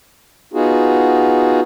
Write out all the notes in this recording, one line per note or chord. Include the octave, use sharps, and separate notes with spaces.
B3 D#4 F4 F#4 G#4